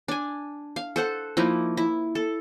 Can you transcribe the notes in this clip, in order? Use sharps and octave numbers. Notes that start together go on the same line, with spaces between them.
D4 G#5
F5
A4 C5 F#5
F3 A#3 D#4 E4
E4
A4